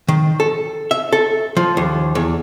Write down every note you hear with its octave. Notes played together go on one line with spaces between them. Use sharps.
D#3
A4
E5
A4
F3
D#2
E2